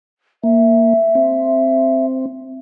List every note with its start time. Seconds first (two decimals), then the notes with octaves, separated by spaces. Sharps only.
0.44 A#3 E5
1.15 C4